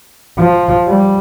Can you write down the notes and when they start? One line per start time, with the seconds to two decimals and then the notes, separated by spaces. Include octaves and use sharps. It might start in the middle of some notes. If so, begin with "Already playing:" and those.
0.38 F3
0.87 G3